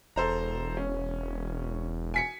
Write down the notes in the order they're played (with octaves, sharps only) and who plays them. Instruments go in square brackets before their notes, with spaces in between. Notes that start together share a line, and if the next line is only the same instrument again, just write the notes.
[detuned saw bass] E1 [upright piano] A4 C5 A#5
[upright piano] C#4
G#5 B6 C#7